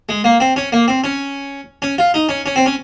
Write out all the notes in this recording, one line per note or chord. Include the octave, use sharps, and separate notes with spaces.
G#3
A#3
C4
C#4
A#3
C4
C#4
C#4
F4
D#4
C#4
C#4
C4
C#4